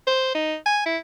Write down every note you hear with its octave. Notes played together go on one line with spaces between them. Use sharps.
C5
D#4
G#5
E4